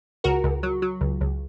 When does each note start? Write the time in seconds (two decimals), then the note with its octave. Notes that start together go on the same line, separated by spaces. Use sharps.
0.24 C#2 F#4 A#4
0.44 C#2
0.63 F#3
0.82 F#3
1.01 C#2
1.21 C#2